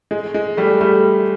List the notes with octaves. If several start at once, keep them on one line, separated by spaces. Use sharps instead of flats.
G#3
G#3
G3 A3
G3 A3